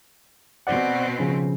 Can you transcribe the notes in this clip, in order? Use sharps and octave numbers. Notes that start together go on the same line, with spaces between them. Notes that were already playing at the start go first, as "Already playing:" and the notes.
B2 C4 C5 D5 F#5
C#3 F3 C#4